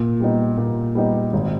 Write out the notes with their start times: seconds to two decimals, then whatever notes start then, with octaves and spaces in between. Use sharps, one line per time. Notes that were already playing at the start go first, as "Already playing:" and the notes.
Already playing: A#2
0.20 G3 B3 D#4
0.57 A#2
0.95 G3 B3 D#4
1.33 G#1